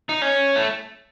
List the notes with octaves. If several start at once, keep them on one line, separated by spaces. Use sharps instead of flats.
D#4
C#4
A3